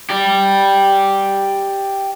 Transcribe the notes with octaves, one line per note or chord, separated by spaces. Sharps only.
G4 D5